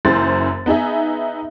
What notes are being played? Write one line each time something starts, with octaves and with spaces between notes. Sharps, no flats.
F#1 F#2 E3 E4 C5 A6
B3 D#4 G#4 E5